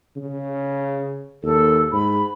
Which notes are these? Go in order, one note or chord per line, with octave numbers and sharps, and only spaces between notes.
C#3
D#2 A4
G#2 B5